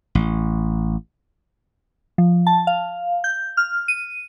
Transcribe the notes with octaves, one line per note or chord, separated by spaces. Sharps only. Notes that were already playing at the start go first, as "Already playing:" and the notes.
A1
F3
A5
F5
G6
F6
D#7